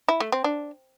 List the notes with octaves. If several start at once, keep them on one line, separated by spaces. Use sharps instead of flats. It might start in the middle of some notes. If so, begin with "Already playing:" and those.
E4
A3
C4
D4